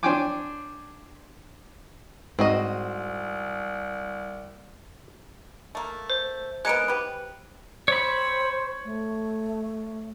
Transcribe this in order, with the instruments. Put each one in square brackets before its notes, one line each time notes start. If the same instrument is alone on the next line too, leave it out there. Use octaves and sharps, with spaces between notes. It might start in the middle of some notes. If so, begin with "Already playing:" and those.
[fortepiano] D4 C5 C#5 G5 G#5 D6
[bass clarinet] C2 [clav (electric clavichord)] G#2 G#4 [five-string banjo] C4 F#4 D#5
[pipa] A3 A#3
[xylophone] C5
[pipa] G#3 A#3 B3 [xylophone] F#6 C#7 D7
[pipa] G4 B4
[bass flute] C5 [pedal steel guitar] C#5 B5
[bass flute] A3